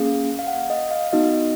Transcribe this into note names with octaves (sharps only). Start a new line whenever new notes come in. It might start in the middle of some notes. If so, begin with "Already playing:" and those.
Already playing: A#3 C#4 G#4 F5
F5
F#5
D#5
F5
B3 D#4 F#4 D#5